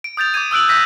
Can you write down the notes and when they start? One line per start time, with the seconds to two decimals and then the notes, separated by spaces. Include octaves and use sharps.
0.04 D7
0.17 D#6 G6 A6 F7
0.34 D6 D#6 G#6 D#7
0.51 D#6 E6 F#6 D7 F#7
0.69 E6 F#6 G6 A#6 B6 D#7